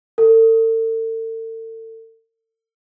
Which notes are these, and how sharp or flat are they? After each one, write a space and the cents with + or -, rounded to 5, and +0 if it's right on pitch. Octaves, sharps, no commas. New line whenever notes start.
A4 +40